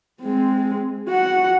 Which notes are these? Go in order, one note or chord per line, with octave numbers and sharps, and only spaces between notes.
G#3 C4
F#4 F#5